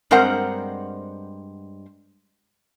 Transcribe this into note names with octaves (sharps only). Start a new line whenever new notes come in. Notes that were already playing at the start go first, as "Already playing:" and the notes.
G2 G#3 C4 A#4 C5 F#5